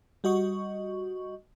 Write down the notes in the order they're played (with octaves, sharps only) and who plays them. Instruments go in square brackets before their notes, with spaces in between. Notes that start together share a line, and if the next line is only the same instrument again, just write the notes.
[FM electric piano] G3 F#4 D#5 C#6